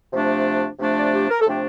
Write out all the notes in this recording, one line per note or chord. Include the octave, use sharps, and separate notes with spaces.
C3 F3 A3 D4
C3 F3 A3 D4
D5
G4
A#4
A4
C3 F3 A3 D4 G4